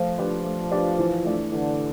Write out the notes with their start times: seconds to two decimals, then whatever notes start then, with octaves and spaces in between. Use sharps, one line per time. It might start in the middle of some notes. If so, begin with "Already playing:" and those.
Already playing: F3 A3
0.18 D4 G4 B4
0.45 A3
0.72 D4 G4 B4
0.98 E3
1.24 A3 D4
1.52 D3 E3